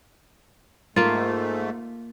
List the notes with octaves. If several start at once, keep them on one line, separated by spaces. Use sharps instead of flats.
G#2 A3 A#3 F4